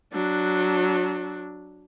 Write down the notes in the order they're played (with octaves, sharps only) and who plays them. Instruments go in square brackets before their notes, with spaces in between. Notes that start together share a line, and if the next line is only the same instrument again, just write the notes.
[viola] F#3 D4